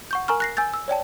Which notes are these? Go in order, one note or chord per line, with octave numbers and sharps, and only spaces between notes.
F#5 C#6 G6
A#4 G#5 A#5 C#6 F6
F#6 A#6 C7
G#5 E6 G6 A6
E6
C#5 D5 G5 A5